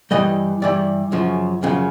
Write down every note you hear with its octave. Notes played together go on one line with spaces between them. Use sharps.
G2 E3 G3 D#5
G2 E3 G3 D5
F#2 C#3 F3
F#2 C#3 F3